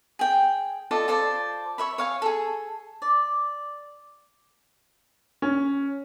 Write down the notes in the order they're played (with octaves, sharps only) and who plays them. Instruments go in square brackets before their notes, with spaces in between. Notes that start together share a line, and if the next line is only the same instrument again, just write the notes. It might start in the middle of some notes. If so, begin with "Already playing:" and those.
[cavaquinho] G#4 G5
F4 A4 D5 D#5
F4 A4 C5 D5
C#5 E5 B5
C#5 F5 G#5
G#4 A4
D5
[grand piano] C#4